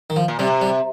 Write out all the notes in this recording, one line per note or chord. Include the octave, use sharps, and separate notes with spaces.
D#3
F3
A#2
C3 G3
G3